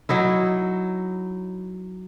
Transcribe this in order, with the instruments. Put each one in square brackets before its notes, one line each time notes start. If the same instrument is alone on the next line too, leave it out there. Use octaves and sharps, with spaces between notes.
[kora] F#3 D#4 E4